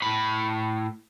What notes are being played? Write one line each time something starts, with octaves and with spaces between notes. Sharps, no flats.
A2 B5